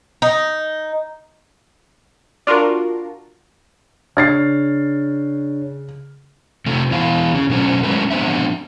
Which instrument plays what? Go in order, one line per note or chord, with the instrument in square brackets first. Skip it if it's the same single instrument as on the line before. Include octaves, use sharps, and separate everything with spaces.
[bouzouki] D#4
[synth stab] D4 F4 F#4 A#4
[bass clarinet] C#3 [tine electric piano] D4 C#5 [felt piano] F6 A6 C7
[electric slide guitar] C3 A3
E2 E3 B3 E4 F5
C#3 C#4
B2 F#3 A3 C#4
F#3 G#3 A3 C#4 B4
F3 B3 C4 D4 E5